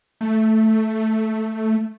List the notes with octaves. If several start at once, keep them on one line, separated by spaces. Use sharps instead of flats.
A3